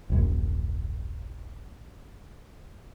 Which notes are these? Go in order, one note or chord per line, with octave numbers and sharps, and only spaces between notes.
D#1 A#1 F#2